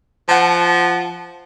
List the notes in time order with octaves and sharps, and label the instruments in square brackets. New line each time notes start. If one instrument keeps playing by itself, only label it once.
[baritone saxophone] F3 [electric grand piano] F#5 A5